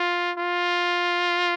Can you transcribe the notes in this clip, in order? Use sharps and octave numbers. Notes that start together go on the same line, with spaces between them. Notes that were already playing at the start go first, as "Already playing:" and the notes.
Already playing: F4
F4